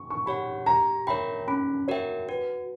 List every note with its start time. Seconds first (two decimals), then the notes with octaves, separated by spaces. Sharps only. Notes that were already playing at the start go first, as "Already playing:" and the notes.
Already playing: C#6
0.10 C#6
0.26 G4 C#5 F#5 B5
0.66 G4 A#5
1.07 A#4 C#5 E5 G5 B5
1.47 C#4 B5
1.88 F#4 A#4 C#5 E5 G5
2.29 F#4 B4